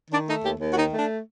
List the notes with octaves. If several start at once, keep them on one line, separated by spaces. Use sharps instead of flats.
D#3 D4
A3 D#4
D#2 G4
D#2
F#4
D#3 D#4
A3 D4